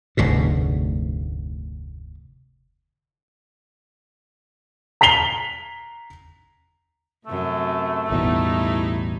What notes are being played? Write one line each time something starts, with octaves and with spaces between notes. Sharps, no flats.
F1 D2 G#2 B2
A#5 B6 C7 F7 G7
F#2 C3 A3
A1 E2 B2 G3 D#4 E4